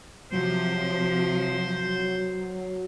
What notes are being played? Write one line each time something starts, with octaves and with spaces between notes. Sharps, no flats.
C3 F3 F#3 C5